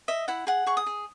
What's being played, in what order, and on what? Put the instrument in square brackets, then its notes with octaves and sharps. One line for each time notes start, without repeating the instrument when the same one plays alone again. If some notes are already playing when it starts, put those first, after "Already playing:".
[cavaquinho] D#5 E5
E4 F#5
G#4 F#5
G#4 C#6
D#6
G#4